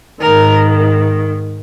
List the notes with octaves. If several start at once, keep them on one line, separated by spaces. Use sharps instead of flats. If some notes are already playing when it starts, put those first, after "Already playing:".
G#2 D#3 A#4